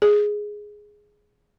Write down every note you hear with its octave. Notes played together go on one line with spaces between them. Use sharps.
G#4